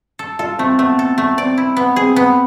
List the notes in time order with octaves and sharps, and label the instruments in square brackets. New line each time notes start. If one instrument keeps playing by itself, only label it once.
[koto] A4
[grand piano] F4 [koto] A4
[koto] A3 [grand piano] C4
[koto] A3 [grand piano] B3
[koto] A4
A3
[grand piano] C4 [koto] D5
[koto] E4
B3
[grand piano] C4 [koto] G#4
[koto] B3